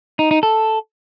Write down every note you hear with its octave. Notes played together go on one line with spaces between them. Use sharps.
D#4
D#4
A4